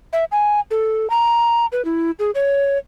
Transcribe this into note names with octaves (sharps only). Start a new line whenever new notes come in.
E5
G#5
A4
A#5
B4
E4
G#4
C#5